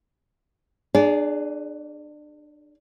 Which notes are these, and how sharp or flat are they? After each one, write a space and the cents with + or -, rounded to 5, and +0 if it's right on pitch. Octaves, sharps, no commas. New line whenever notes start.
D4 +30 G#4 +0 D5 -30